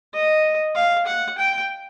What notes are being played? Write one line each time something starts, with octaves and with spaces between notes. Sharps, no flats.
D#5
F5
F#5
G5